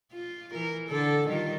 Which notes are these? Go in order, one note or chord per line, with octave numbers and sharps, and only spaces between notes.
F4
E3 A#4
D3 A4
D#3 G3 F4